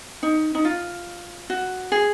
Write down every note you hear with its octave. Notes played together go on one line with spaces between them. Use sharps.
D#4
D#4
F4
F#4
G#4